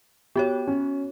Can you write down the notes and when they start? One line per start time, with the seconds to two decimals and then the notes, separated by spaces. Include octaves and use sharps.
0.35 B3 F#4 G4 C#5
0.67 C#4